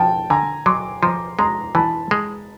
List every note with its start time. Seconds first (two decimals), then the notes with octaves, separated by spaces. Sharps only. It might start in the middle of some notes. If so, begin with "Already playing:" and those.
Already playing: F3 G5 A5
0.30 D3 G#5 A#5
0.66 F#3 C6 D6
1.02 F3 A#5 C6
1.39 G#3 A#5 C6
1.75 E3 A5 B5
2.11 G#3